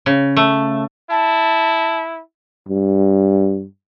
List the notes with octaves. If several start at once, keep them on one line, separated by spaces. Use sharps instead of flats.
C#3
A3
E4 A5
G2